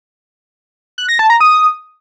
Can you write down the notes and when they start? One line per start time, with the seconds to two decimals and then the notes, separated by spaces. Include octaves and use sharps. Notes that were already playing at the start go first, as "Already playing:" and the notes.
0.98 F#6
1.09 A#6
1.19 A5
1.30 A#5
1.40 D#6